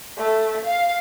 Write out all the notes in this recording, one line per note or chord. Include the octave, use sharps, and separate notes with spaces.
A3
F5